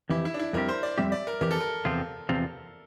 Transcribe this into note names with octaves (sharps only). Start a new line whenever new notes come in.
F2 E3 E4 G4
E4
D4
E4
F2 E3 G3 C4 G4 A#4
C5
D5
F2 E3 G3 C4 G4 E5
D5
A#4
F2 E3 G4 A#4
A4
A#4
E2 C3 F3 C4 F4
E2 C3 F3 C4 F4